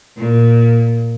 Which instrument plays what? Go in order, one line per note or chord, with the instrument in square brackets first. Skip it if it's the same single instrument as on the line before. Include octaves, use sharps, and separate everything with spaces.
[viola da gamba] A#2